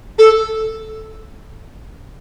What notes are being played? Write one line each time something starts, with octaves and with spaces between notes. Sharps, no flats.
A4